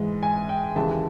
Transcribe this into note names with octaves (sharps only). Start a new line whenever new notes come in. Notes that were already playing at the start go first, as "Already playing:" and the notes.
Already playing: G#2 E3 G#3
G#5
G5
D#2 C#3 E3 G#3 A5